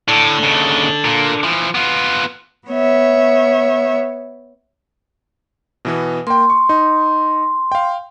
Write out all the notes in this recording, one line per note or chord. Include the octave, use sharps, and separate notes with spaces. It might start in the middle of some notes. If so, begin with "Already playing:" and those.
A2 D4 A4
D#2 C#3
A#2 A#3
E3 F3
B3 F4
B3 C#5 E5
B2 E3 B3
A#3 G5 C6
C#6
D#4
F5 G5